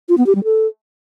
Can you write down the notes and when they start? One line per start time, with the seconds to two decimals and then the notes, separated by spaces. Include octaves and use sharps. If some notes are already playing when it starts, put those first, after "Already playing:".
0.09 F4
0.18 B3
0.26 G4
0.35 G3
0.44 A4